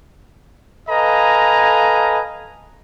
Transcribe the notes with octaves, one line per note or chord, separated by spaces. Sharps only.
A4 B4 D#5 F5 G#5 A#5